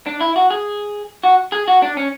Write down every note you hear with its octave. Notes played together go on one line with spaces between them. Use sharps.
D4
E4
F#4
G#4
F#4
G#4
F#4
D4
C#4